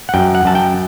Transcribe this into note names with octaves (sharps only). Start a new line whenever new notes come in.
F#5
F#2 G5
F#5
F#2 A5
G5